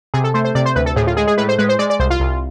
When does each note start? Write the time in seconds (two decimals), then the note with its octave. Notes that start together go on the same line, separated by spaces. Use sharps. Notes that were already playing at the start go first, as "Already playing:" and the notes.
0.14 C3 G#4
0.24 A4
0.34 A3 C5
0.45 C5
0.55 C3 D5
0.66 C5
0.76 D2 B4
0.86 A4
0.96 A2 G#4
1.07 F4
1.17 G#3 G#4
1.28 G#4
1.38 A2 B4
1.49 C5
1.58 G#3 B4
1.69 C5
1.79 G#3 D5
1.90 D5
2.00 C2 C5
2.10 F4
2.20 C2